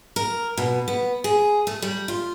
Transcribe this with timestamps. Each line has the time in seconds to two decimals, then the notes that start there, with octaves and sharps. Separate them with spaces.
0.16 A#4
0.57 B2
0.88 B3
1.24 G#4
1.67 A3
1.82 G3
2.08 F4